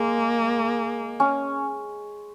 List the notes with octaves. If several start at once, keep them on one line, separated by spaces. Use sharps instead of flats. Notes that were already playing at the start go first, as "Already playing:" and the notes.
Already playing: G#3 A#3
C#4